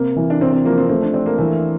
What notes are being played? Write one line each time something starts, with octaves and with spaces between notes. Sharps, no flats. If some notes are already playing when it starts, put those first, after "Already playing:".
Already playing: C3 A#3
E3
D4
C3 C4
C4
F3 A#3
C4
A3 C4
D4
C4 D4
A#3
E3 A3